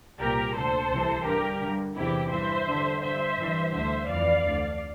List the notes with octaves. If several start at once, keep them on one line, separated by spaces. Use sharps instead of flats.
C2 A#2 G4 A#4
D2 D3 A4 C5
C2 C3 E3
G2 D3 G4 A#4
G2 D3
E2 C3 E3 E4 G4
G2 E3 C5 E5
G2 D3
G2 D3 C5 E5
G2 E3
D2 D3 C5 E5
F2 E3 D5 F5
D2 D3